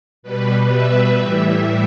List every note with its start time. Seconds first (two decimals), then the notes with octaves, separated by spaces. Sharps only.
0.23 B2 G3 B4
0.71 E5
1.19 A2 E3 G3 E5